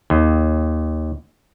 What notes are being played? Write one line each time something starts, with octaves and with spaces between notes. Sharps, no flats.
D#2